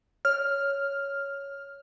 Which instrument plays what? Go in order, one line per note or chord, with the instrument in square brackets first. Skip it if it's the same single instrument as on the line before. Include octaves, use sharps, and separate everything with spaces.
[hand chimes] C#5 [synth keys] F6